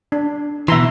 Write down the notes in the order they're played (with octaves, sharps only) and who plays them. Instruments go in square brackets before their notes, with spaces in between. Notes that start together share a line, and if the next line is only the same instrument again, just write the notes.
[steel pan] D4
[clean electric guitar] B2 E3 [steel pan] E5 A#5 C6